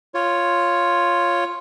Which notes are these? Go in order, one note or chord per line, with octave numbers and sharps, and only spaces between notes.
F4 C#5